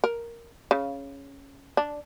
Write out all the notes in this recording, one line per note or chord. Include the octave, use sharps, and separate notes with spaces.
A#4
C#3
D4